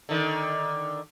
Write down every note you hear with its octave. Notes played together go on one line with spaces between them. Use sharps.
D3 D#3